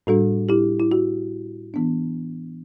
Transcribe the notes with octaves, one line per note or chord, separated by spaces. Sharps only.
A2 G3 D4 F#4 A4
E4 G4
E4
F#4
E3 B3 D4